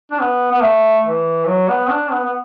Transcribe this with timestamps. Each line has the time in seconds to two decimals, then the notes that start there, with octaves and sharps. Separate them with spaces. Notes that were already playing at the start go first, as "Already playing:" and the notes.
0.11 D4
0.21 B3
0.52 B3
0.63 A3
1.06 E3
1.47 F#3
1.69 B3
1.90 D4
2.11 B3
2.25 B3